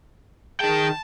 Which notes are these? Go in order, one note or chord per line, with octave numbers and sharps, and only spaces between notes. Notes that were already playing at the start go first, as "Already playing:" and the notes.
D#3 G#4 G5 A5